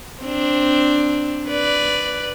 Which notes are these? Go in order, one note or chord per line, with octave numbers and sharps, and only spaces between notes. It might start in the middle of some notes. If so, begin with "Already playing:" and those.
C4 D4
B4 D5